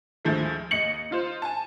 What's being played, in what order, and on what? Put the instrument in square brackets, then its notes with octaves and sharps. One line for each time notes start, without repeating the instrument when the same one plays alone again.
[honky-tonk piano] D2 A2 F3 G#3 A3
D#2 D#5 C#7 F#7
D#4 F4 C5
G#5 A5